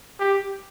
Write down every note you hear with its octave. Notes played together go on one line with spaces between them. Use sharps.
G4